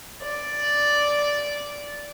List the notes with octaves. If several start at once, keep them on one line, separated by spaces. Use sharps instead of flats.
D5